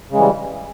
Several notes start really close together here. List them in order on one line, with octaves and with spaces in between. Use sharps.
C#3 G#3 E3 G3